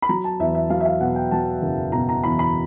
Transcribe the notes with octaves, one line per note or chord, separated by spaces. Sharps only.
B5
F#3 A#5
A5
E2 E5
E5
F#3 F5
E5
F5
B2 F#5
G5
F#3 A5
F#1
B2 A#5
A#5
E2 B5
B5